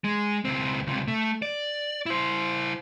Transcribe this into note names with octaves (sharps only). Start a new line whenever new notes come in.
G#3
C#2 C4
C#2 C3
A3
D5
E4 C5